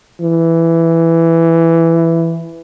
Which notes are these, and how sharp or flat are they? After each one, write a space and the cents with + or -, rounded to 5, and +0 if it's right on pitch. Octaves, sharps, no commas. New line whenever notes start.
E3 +5